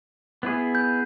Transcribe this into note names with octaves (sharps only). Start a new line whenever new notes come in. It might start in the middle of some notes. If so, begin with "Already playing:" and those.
B3 E4 G#4
G6